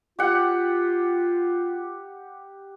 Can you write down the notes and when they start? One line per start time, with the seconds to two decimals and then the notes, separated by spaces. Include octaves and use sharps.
0.19 F4 G4 F#5